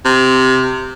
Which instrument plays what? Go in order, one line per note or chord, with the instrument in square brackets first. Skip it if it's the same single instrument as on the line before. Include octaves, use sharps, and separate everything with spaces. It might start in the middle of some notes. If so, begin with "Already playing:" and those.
[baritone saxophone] C3